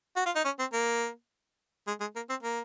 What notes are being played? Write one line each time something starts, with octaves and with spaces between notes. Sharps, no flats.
F#4
F4
D#4
C#4
C4
A#3
G#3
G#3
A#3
C4
A#3